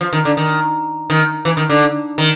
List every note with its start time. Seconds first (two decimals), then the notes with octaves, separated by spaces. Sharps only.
0.01 F3
0.13 D#3
0.25 D3
0.37 D#3
1.10 D#3
1.45 E3
1.57 D#3
1.69 D3
2.18 D#3